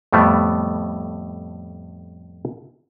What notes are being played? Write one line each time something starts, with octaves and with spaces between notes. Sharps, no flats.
F2 A2 G3 A3 B3